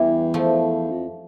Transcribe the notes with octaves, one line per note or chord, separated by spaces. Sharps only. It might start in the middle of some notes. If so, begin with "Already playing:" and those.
Already playing: E2 E3 G3
F3 A3
F2